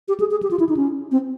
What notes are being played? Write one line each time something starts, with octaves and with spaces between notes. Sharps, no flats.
G4
G#4
G#4
G4
F4
E4
D#4
C#4
C4